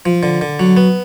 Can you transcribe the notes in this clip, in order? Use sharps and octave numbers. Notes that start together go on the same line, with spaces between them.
F3
D3
D3
F#3
B3